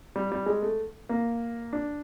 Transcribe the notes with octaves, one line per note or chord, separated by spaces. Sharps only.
G3
G3
G#3
A3
A#3
D4